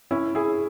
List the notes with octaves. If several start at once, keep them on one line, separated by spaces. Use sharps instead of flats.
C#4 E4
E4 G#4